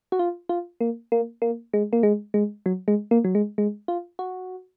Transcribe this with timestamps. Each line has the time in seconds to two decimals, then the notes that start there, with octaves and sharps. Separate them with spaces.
0.12 F#4
0.19 F4
0.49 F4
0.81 A#3
1.12 A#3
1.42 A#3
1.74 G#3
1.93 A#3
2.03 G#3
2.34 G#3
2.66 F#3
2.88 G#3
3.11 A#3
3.24 F#3
3.35 G#3
3.58 G#3
3.88 F4
4.19 F#4